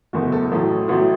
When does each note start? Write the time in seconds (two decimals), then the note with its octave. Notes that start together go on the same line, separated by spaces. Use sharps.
0.13 F#1 E2 B2 A3 F#4
0.32 A4
0.52 A1 A2 F#3 A3
0.88 A1 A2 F#3 A3 F#4